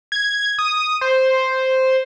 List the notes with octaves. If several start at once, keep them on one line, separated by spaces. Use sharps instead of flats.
G#6
D#6
C5